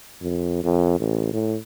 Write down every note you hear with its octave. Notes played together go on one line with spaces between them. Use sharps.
F2
F2
A1
A2